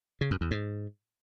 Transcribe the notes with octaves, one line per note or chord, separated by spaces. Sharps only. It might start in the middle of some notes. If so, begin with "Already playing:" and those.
C#3
F#2
E2
G#2